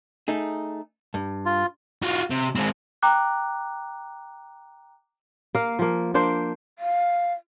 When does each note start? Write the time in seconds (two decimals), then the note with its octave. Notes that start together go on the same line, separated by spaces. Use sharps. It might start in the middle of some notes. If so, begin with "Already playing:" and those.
0.28 A3 D#4 G#4
1.14 G2
1.46 F4
2.02 F4 F#4
2.31 C3
2.56 G#3 C4
3.03 G5 A#5 D6 F#6
5.55 A#3 F5
5.79 F3 A#3
6.14 A#3 D4 C5 D5
6.79 F5